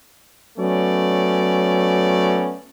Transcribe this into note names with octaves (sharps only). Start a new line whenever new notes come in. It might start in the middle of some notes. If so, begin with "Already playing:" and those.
F#3 A3 B3 C#4 D5